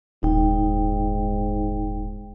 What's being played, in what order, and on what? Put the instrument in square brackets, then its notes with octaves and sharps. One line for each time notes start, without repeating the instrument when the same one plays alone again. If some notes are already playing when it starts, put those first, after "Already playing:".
[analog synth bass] D#1 [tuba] G#2 [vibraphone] D#4 G5